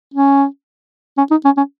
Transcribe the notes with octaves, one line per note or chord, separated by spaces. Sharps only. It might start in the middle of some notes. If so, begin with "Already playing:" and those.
C#4
C#4
D#4
C#4
C#4